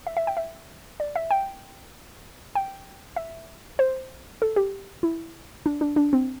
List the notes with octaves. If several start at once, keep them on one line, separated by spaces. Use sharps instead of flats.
E5
E5
G5
E5
D5
E5
G5
G5
E5
C5
A4
G4
E4
D4
D4
D4
C4